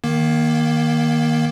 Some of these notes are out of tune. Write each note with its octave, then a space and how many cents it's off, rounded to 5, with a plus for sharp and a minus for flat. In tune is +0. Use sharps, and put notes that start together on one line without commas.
D#3 +0 A#3 +20